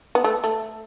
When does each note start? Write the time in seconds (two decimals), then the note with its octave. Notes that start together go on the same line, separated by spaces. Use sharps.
0.15 B3
0.24 A3
0.44 A3